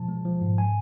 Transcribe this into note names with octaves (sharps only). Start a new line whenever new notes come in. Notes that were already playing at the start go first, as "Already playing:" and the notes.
Already playing: B2 F3 A5
G#3
F3
G#2
G#5